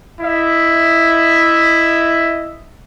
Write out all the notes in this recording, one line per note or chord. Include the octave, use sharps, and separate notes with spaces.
E4 D#5 E5